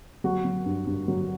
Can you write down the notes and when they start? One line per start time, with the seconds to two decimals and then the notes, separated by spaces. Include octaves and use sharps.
0.24 F#3 F#4
0.45 F#3
0.66 G2
0.87 G2
1.08 F#3